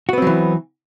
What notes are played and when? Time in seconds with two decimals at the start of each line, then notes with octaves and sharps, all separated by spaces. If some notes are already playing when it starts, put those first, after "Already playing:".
0.09 F#4
0.13 B3
0.18 C4
0.22 F#3
0.27 E3